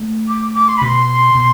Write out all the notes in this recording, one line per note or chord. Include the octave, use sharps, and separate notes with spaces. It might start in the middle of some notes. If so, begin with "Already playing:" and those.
Already playing: A3
D6
D6
C6
B5
B2 C6
B2